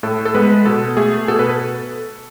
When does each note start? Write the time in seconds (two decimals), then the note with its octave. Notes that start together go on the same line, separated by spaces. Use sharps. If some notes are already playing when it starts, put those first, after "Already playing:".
0.03 A2 A4
0.25 A4
0.34 G#3 B3 B4
0.65 B2 A4
0.97 A3 G#4
1.28 B2 A4
1.39 B4
1.50 A4